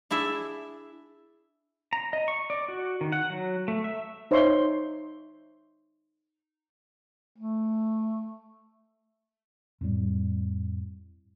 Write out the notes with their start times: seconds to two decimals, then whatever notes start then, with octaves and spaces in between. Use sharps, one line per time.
0.11 D4 E4 G#4 E5
1.93 A#5
2.13 D#5
2.28 C#6
2.50 D5
2.68 F#4
3.01 D#3
3.12 F#5
3.30 F#3
3.68 A3
3.84 E5
4.31 D#4 C5 C#5 E5 C6
7.37 A3
9.81 F2 A2 G3